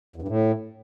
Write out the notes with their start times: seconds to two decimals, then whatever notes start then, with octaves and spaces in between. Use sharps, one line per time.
0.16 E2
0.22 G2
0.28 A2